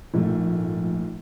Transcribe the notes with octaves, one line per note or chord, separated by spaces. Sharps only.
A#1 G#2 G#3 A3